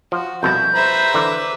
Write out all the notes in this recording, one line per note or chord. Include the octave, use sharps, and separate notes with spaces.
F3 F#4
C2 F2 B2 E4 G6
B4 C5 E5 A#5 B5
D3 E3 D6